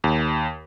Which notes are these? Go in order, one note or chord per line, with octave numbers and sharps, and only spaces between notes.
D#2